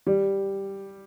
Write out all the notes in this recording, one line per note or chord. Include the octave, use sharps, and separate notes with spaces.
G3